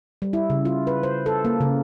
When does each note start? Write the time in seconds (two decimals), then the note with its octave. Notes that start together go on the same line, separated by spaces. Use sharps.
0.22 G3
0.33 E4
0.50 C#3
0.65 F4
0.87 B4
1.03 C5
1.26 A4
1.45 A#3
1.61 C#3